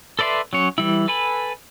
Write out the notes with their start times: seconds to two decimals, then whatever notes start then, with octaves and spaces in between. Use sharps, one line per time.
0.19 A4 B4 D5 E5 C6
0.53 F#3 C#4 C#5
0.78 E3 G3 E4
1.08 A4 B4 G#5 B5